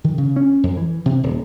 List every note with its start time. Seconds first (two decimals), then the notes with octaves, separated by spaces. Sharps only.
0.04 D#3
0.18 C#3
0.36 C#4
0.63 F2
0.77 E3
1.06 C3
1.23 D#1